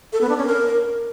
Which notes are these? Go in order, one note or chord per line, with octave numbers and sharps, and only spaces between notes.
A4
B3
D4
C#4
A#4